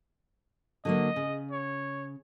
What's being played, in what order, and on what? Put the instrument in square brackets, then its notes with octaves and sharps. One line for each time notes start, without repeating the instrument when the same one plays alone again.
[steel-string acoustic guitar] D3 F#3 A#3 [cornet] D#5
[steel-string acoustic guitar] C#3
[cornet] C#5